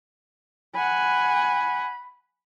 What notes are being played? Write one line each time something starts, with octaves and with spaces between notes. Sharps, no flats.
F#5 G#5 B5